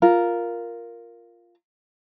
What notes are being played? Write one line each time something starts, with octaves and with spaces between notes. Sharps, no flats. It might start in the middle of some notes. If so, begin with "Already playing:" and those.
F4 A#4